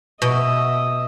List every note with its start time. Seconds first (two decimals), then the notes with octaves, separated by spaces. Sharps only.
0.22 B2 D#5 E5